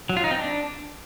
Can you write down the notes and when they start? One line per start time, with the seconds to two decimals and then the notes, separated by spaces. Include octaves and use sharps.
0.09 F#3
0.17 F4
0.24 D#4
0.31 C4
0.38 D4